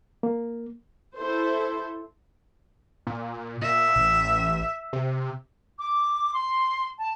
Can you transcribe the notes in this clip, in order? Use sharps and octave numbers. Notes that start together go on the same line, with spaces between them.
A#3
E4 A4 C5
A#2
A#2 E5
A1
C3
D6
C6
A5